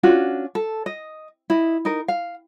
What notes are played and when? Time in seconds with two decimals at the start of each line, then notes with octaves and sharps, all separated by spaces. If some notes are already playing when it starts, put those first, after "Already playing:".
0.03 C#4 D4 F4 F#4
0.55 A4
0.86 D#5
1.50 E4 D#5
1.85 D#4 A#4
2.08 F5